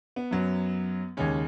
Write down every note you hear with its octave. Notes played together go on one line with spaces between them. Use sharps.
B3
F#2 F#3
D#2 C#3 G#3 C#4